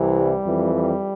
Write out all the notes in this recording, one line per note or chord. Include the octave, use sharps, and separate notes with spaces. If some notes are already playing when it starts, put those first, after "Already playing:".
Already playing: C2 C3 E3
G3
F2 E3
G3